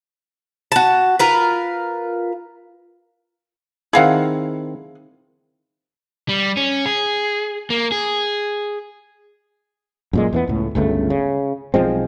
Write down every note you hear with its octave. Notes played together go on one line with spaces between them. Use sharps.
F#4 A5
F4 A#4 B4
D#3 C4 E4 G#4 F5 F#5
G3
C#4
G#4
A#3
G#4
F#2 A#2 G#3
E2 E3 B3
C#2 A2
G1 C#2 C#3 A3
C#3
B1 F3 G#3 C4